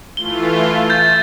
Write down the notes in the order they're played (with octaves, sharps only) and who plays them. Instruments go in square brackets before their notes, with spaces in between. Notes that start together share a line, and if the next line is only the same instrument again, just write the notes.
[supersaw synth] E3 A3 F4 [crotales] G7
[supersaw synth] E5 [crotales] G6 A6